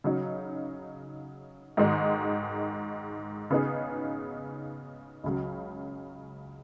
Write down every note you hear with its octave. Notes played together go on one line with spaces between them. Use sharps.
C#3 F#3 D#4
G#2 D#3 G#3 D#4
C#3 B3 D#4 G#4
C#2 C#3 F#3